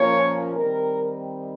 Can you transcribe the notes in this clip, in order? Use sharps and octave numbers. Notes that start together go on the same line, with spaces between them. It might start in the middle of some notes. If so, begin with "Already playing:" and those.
Already playing: A#2 F3 A#3 C#4 C#5
D#3 G3 C4 D#4 A#4